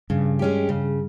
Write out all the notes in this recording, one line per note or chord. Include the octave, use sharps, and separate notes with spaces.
G2 C#3
G#3 C#4 G4
C#3